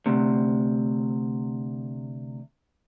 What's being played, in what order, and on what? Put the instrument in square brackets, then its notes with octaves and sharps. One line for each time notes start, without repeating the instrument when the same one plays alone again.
[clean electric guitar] D2 C3